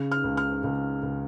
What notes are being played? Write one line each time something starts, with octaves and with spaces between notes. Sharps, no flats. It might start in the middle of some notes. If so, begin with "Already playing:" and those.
Already playing: C#3
F6
C#2
F6
C#2
C#2